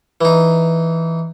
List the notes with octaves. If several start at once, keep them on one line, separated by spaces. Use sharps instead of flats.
E3 D#4